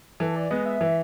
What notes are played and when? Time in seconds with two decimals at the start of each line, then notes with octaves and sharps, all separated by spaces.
0.20 E3 A4
0.36 D5
0.51 G#3 B3 D#5
0.66 E5
0.81 E3